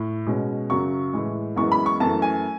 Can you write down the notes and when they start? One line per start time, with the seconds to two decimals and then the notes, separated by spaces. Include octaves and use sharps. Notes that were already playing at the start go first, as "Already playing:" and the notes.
Already playing: A2
0.26 B2 G#3 C#4
0.70 F#2 C#3 F#3 C#6
1.13 A2 E3 G#3
1.56 F#2 E3 G#3 B3 C#6
1.72 B5
1.86 C#6
2.00 F#2 E3 A3 A5
2.22 G#5